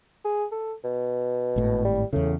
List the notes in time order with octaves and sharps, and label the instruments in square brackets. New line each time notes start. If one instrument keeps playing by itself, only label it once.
[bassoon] G#4
A4
B2
[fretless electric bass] G#1 A2
[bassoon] G3
[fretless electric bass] E2 C#3 [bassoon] A2